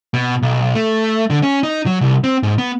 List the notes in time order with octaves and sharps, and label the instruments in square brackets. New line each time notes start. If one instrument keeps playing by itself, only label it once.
[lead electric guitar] B2
B1
A3
D3
C#4
D#4
F#3
C2
C4
G#2
B3